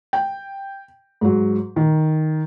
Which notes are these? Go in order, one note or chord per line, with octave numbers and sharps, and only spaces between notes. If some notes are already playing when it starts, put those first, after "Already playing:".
G5
G#2 F#3
D#3